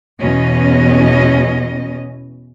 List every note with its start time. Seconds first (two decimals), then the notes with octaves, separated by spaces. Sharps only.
0.21 E2 B2 E3 C#4 D#5